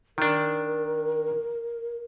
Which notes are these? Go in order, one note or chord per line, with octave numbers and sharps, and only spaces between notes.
D#3 D4 A#4